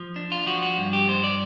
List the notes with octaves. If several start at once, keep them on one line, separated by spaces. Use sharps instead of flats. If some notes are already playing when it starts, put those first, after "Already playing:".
Already playing: F3
D4
F4
F3 F#4
F#4
G2
G4
G2 C5
D5